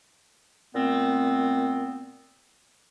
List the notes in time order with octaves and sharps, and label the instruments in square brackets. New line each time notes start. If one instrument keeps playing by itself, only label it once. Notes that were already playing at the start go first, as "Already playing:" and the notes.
[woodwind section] A#2 A3 B3 C4